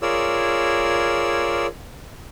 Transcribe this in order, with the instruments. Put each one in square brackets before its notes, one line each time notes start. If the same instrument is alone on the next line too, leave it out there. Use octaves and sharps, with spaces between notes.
[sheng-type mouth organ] F4 G#4 A#4 C#5 D5 E6